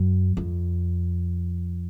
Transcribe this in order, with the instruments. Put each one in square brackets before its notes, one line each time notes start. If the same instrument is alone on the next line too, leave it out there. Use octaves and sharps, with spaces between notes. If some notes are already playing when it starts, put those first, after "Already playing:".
Already playing: [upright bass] F#2
F2